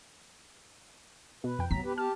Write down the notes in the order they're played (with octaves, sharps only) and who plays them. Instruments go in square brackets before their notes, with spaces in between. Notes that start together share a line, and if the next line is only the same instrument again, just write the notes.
[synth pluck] B2 [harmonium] B4
[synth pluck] F2 G5
[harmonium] F#3 A#5 [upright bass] B3 [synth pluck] B6
[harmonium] G2 G4 B4
[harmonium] G4 A5 [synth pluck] F6